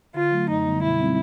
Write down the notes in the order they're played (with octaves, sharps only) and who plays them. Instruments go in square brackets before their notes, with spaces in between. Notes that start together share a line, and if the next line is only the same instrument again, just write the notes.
[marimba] D3 [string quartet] F4
[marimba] F#3 A3
[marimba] F#2 [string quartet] D#4
[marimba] D3 G3 B3
[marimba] B2 [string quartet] E4
[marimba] G3 C4 D#4